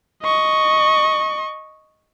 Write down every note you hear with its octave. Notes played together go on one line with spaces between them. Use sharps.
D#5 C#6